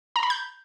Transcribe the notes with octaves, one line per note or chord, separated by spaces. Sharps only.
A#5
B5
G6